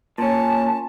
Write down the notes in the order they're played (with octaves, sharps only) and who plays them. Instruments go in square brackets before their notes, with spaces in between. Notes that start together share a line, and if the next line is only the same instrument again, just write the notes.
[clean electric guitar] A#2 C#4 [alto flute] A5